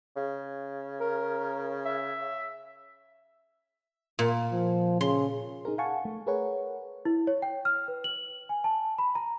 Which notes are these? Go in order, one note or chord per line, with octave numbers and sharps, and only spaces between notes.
C#3
A#4
E5
A#2
F3
C#3 C6
D#4 G#4 A#4
F5 F#5 G#5 A5 C#6
A3
G#4 A#4 B4 C#5 F#5
E4
C#5
G5
F6
B4
F#7
G#5
A5
B5
A#5